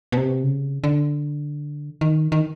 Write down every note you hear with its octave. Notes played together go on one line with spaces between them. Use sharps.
B2
C3
C#3
D3
D#3
D#3